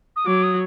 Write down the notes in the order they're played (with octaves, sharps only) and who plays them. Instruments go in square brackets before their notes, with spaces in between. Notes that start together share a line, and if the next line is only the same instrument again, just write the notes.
[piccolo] D#6
[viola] F#3 [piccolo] D6
[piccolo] D#6